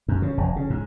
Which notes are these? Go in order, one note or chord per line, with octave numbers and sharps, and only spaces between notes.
F#2
C#3
F1
C#3
G#2